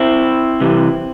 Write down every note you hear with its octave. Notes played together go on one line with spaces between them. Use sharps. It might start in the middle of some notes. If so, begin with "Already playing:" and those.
Already playing: C4 E4
C3 E3 G3